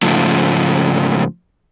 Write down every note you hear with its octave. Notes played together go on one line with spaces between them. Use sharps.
G#2 C#3 F3 A3